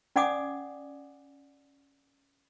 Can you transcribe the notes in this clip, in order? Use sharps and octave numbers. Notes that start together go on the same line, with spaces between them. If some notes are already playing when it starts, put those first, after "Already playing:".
C#4 D5 F#5 G#5 D6 D#6